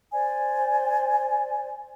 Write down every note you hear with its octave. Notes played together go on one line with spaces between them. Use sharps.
C5 D5 G#5